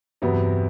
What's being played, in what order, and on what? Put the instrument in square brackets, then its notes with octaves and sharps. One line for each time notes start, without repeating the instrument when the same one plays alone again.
[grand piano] E2 C3 F#3 B3 [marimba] G2